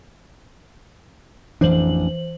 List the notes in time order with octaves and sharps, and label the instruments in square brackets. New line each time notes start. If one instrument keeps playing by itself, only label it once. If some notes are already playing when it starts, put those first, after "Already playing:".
[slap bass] A1 F2 D4 [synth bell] E3 C5 F#7